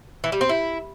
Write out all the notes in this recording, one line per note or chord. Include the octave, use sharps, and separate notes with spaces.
E3
G3
C4
E4